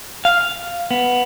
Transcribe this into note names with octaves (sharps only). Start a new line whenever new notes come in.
F5
B3